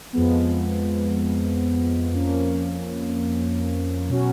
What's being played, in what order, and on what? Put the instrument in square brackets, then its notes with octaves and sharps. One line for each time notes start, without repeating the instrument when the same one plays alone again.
[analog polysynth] F2 F3 G#3 B3
F2 F3 A#3 C#4
B2 F#3 C#4 F#4